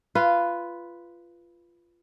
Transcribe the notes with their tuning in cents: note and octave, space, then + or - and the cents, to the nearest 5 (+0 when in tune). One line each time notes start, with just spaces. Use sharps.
F4 -15 B4 +0